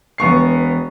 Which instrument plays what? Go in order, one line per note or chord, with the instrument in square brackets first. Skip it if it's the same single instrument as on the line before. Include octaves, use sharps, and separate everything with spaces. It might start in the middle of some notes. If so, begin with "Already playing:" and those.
[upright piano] E1 B3 C#6 C7